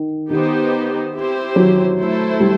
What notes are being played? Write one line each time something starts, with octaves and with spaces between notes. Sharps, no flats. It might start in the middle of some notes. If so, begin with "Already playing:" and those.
Already playing: D#3
D#3 B3 D#4 G4 C5
C4 E4 G4 C5
F#3
A3 E4 A4 C5
G3